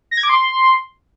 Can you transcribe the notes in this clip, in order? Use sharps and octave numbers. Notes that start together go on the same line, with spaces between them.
A#6
G#6
D6
C6